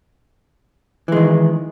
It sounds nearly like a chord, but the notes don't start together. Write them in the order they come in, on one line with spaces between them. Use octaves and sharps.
E3 G#3 D#3